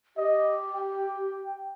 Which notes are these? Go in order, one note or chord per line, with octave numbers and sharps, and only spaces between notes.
G4 D#5
G5